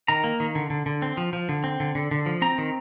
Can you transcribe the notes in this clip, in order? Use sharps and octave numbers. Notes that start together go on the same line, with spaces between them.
D#3 A#5
A#3
D#3
D3
D3
D3
C4
F3
F3
D3
C4
D3
D3
D3
F3
C4 A#5
D#3